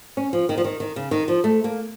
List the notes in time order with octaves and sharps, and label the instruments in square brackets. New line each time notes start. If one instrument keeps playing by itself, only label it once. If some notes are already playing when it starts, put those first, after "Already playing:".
[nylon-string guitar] C#4
F3
D#3
F3
D#3
D#3
C#3
D#3
F3
A3
A#3